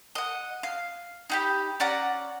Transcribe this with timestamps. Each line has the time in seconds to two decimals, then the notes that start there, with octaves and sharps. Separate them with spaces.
0.15 D#5 F#5
0.63 F5
1.30 D#4 G4 B5
1.80 C#4 D5 F#5 A#5